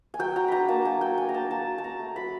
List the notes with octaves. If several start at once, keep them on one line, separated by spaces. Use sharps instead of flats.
G#5
F#3 G5
F#3 A#5
D4 A#5 B5
A#3 A5
F#3 G#5
F#3 G5
D4 G#5
A#5
A#3 A5
F#3 A5
F#3
A5
C#4 A#5
A3
F#3 B5